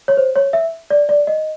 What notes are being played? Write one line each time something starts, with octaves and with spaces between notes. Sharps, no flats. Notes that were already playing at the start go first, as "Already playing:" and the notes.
C#5
C5
C#5
E5
D5
D5
D#5